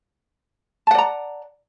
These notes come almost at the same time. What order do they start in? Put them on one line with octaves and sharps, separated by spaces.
A5 F#5 D5 A#5